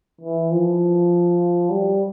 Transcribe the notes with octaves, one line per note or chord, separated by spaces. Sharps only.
E3
F3
G3